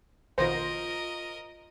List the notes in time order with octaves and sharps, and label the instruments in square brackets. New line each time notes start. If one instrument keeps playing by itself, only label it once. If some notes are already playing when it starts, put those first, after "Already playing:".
[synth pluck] A#1 B2 D#3 [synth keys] F4 A#6 [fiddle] A#4 D#5 [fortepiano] C5